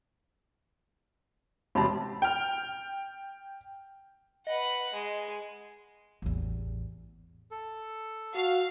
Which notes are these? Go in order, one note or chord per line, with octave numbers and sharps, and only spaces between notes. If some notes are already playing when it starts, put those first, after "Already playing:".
E1 C3 C#5 A5 B5 C6
G5 F6
B4 D#5 F#5
G#3
A1 E2
A4
F#4 F5